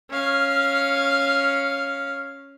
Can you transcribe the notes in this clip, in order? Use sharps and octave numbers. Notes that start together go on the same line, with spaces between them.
C#4 F5